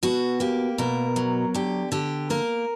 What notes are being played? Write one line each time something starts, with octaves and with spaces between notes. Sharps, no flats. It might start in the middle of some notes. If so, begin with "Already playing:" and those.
B2 F#4
A#3 G4
B2 A#4
F#3
D3 G4
D3 G4
A#3 A#4